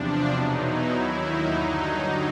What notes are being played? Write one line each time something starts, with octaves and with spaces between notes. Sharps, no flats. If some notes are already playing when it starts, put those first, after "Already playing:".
Already playing: E2 C3 F3 D4
E2 B2 F#3 D#4
E4
D#2 D#3 F#3
D#4
G2 D3 F#3